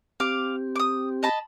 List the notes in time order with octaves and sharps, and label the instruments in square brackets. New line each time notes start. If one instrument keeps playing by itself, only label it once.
[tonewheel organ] C4 G4 [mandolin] F5 D6
[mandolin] D6 D#6
D#5 A5 B5